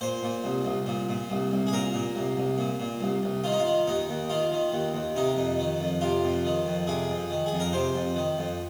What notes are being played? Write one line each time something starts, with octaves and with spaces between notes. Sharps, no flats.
A#2 C5
A#2
C2
C2
A#2
A#2
C2
C2
G#4
A#2 A#4
A#2
C2
C2
A#2
A#2
C2
C2
D#3 F4
D#4
F4
D#3
D#2 D#4
D#2
D#3 F4
D#3
D#2
D#2
C3 D#4
F2
D#3
F2
C3 F4
F2
D#3
F2
C3 G#4
F2
D#3
G#4
F2
A#4
C3 C5
F2
D#3
F2